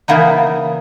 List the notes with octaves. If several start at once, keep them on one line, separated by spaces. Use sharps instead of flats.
C#3 E3 A#3 B3 D#4